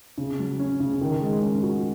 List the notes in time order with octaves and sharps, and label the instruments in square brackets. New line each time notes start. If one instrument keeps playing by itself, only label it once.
[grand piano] C#3
F#3
C#4
C#3
D#3
G#3
C#4
F#4